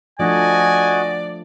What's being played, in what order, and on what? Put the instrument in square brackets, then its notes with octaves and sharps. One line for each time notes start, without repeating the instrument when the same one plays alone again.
[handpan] F3 A3 D4 [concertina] F#4 D#5 [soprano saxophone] D5 [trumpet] G#5